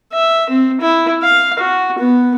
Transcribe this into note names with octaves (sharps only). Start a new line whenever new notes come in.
E5
C4
E4
F5
F#4
B3